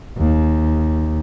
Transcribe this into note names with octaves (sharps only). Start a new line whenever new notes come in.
D#2